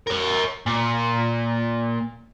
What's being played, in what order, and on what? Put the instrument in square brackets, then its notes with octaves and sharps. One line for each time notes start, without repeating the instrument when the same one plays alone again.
[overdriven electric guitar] A#4 C#5
A#2